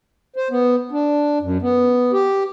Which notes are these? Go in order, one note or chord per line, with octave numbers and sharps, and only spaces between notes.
C5
B3
D4
F#2
B3
G4